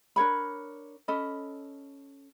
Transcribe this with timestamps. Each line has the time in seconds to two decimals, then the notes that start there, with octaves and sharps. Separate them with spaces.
0.16 D4 A#4 C#5 B5
1.08 C#4 A4 D#5 B5